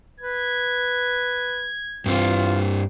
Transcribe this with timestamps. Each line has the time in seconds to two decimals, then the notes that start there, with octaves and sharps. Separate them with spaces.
0.20 B4 G#6
2.06 G2 C4 F4